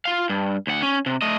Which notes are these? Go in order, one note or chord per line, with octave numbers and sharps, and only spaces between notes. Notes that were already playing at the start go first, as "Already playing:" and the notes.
F4 F5
G2
D2 F#5
C#4
C3
A3 D#5